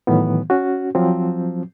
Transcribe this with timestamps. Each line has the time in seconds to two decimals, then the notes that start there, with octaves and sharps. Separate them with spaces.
0.07 A2 D#3 E3 F#3 B3
0.50 C#4 F#4
0.95 F3 F#3 C4